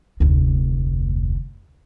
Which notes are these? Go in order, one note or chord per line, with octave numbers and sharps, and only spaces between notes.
F1 D2